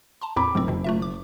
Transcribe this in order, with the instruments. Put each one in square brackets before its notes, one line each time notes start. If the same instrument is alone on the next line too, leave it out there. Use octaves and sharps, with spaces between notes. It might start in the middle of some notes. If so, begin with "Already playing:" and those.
[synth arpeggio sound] A5 A#5 C6
[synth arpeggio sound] E2 A2 C4 [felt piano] B5 D6
[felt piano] F#1 [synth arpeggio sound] G#2 B2 C4
[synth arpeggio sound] F2 B2 D#3
A3 F4 E5
D6